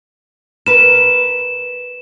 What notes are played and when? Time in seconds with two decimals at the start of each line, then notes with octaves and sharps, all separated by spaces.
0.66 A#4 B4 E7